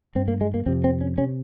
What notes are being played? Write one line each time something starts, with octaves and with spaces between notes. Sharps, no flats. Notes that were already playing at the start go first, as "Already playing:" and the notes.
G2 C4
A#3
G#3
A#3
F2 C3 C4
C4
C#4
C3 C#4